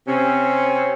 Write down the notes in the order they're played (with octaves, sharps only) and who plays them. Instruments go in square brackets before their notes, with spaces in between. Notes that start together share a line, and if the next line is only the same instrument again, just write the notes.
[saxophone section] C3 C4 C#4